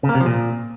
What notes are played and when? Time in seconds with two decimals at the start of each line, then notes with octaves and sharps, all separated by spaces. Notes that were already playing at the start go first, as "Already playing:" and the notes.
0.03 C#3
0.09 A#3
0.15 C3
0.20 F3
0.26 A#2